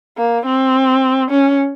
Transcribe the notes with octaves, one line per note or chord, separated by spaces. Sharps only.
A#3
C4
C#4